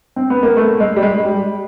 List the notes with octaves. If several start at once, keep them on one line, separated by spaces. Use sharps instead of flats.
C4
B3
A#3
A3
G#3
G3
G#3
G3